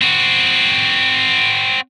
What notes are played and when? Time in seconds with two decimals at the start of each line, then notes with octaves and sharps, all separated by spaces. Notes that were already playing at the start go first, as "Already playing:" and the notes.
0.01 C4 F#4